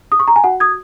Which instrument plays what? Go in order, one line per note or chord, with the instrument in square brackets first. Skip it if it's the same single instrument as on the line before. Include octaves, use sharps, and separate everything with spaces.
[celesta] D#6
C#6
A#5
G#5
F#4 F#5
D#6 G#6